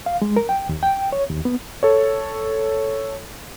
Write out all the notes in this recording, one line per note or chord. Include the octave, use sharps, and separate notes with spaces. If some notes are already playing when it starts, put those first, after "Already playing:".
F5
G#3
A#4
G5
D#2
G5
C#5
D#2
B3
A4 C#5